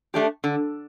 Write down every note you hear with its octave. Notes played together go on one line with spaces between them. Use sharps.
A3 D4 G4
D3